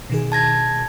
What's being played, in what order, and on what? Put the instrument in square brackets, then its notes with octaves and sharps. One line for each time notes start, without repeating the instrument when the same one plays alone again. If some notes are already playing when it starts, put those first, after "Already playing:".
[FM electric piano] B2 D#3 G#4
[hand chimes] A5 G#6 A#6